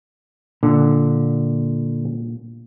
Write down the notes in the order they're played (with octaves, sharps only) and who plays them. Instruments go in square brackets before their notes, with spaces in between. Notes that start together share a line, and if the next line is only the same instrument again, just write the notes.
[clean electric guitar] A#2 [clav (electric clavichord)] D3